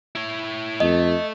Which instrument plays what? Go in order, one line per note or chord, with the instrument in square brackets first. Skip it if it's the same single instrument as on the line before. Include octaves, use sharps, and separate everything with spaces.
[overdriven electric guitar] E4 C#5
[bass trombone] F2 [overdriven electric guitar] A3 [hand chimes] D#5